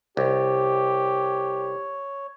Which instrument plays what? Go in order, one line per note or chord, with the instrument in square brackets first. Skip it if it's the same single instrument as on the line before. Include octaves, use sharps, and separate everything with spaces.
[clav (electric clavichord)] C2 [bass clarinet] G4 [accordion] C#5